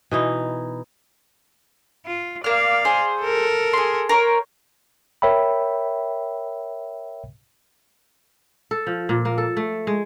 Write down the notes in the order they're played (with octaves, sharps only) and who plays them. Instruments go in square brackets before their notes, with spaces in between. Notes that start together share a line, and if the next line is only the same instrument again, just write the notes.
[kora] B2 E3 D#4
[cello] F4
[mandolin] A#3 F6 [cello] D5 F5
[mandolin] G#4 C5
[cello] A4 A#4
[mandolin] G#4 C6
A#4 C5 C#5
[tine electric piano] A#4 C#5 E5 G5 B5
[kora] A4
F3
A#2
A#3
A4
A3
G#3